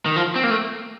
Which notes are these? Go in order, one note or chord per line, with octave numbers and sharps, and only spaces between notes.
D#3
F3
C4
A#3
A3